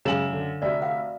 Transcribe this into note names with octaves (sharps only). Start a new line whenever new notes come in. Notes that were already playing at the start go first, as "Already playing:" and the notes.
F#2 C#3 G#3 C#5 F5 G#5 E7 F#7
D3
F1 F#4 D5 E5
F5 F#5